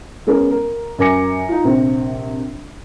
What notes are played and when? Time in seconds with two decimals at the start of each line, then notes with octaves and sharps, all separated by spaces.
0.27 G#3 B3 C#4 A#4
0.51 A#4
0.98 F#2 A#4 G#5 D6 A#6 C#7
1.49 D#4 F4
1.64 A#1 C3 C4